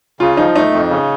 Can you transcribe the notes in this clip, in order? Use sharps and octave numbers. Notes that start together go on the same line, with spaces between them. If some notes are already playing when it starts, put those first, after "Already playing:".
C#3 F4
F3 D#4
A3 D#4
F2
C#3